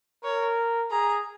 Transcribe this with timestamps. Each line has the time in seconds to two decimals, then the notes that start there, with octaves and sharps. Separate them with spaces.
0.24 A#4 C#5
0.91 G#4 A#5